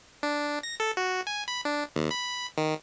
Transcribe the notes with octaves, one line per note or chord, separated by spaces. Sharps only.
D4
A#6
A4
F#4
G#5
B5
D4
D#2
B5
D#3